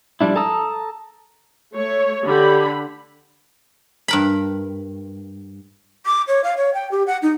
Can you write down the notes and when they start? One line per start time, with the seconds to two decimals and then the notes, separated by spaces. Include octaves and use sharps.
0.21 F3 G3 D4 E4
0.36 A4 A5 A#5 D#6 E6
1.74 A3 C#5
2.25 D3 G4 B5
4.08 G2 A#4 B5
6.06 D6
6.28 C#5
6.44 F5
6.57 C#5
6.74 G5
6.91 G4
7.07 F#5
7.22 D#4